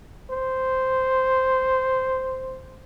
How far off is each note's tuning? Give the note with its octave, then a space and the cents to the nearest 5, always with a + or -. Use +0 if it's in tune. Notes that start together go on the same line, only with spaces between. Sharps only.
C5 -5